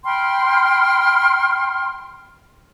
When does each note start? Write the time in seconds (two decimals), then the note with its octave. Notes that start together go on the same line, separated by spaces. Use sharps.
0.06 G5 B5 C6 F6